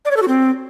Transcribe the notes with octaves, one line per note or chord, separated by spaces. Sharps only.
D5
C#5
A4
F#4
C4